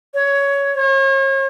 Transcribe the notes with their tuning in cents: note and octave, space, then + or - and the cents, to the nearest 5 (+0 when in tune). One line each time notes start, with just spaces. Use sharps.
C#5 +15
C#5 -40